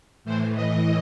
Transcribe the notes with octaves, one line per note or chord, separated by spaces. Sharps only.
A2 E3 C5
D#5